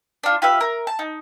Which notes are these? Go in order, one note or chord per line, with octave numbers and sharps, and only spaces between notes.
D4 F4
F4 G4 B4 E5
A#4
A5
D#4